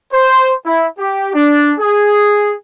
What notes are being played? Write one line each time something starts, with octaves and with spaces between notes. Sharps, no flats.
C5
E4
G4
D4
G#4